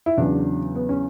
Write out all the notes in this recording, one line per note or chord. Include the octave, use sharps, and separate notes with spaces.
E4
E2 C#3 F#3 D4
B3
C#4